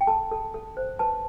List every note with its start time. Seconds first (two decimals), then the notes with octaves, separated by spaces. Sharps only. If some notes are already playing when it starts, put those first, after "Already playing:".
0.01 G5
0.07 A4 A5
0.31 A4
0.54 A4
0.77 C5
0.99 B4 A5